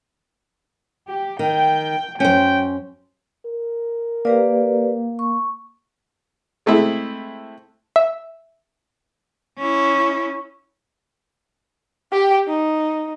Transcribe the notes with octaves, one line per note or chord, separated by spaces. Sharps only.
G4
D#3 G5
F#2 C#4 C5 G5
A#4
A#3 G4 B4 D5
C#6
G#3 A3 C4 E4
E5
C#4 E4
G4 G5
D#4